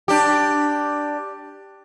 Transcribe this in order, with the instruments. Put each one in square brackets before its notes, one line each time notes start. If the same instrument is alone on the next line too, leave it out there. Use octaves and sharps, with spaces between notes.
[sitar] D4 G4